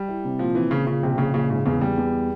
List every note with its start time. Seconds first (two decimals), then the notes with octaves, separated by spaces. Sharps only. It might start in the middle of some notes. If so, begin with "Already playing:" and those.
Already playing: G3
0.09 E4
0.25 C3
0.39 A#2 F3
0.55 E3 C4
0.71 A#2 C#3
0.87 C#3 F4
1.03 A#1 C3
1.18 A#1 C#3
1.34 A#1 C#3
1.50 G#2 C#3
1.65 E2 C#3
1.81 E2 G3
1.98 E2